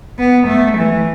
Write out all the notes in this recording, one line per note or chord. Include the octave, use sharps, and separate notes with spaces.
B3
A3
E3